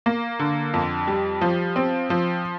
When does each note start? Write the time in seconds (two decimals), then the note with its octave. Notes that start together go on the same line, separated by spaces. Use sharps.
0.06 A#3
0.39 D3
0.74 F2
1.07 G3
1.41 F3
1.76 C4
2.10 F3